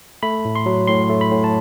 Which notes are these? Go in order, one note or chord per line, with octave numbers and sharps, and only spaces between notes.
A3 B5
A2
C6
F#3
A2 C6
A3
B5
A2
A5